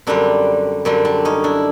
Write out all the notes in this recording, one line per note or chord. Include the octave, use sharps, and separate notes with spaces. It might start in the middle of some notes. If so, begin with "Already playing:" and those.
F#2 D3 G3 C4 D4
F#2 D3 G3 C4 D4
C4 D4
C#4 D#4
D4 E4